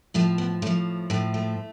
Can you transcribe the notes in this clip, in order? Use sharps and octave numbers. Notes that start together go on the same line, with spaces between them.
A2 F3 A3
B3
A2 F3 A3
A2 F3 A3
A3